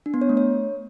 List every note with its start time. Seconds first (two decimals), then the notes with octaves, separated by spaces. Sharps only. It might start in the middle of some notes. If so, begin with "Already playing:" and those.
0.06 D4
0.14 B3
0.21 C#5
0.29 A3
0.37 C#5